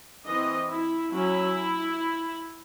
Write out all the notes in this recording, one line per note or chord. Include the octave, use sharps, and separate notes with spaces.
E3 C4 D#5
E4
F#3 C#4 E4